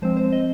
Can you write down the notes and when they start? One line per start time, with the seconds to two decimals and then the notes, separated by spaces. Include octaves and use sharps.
0.02 F3 G#3 C4 C5
0.17 C5
0.32 D#5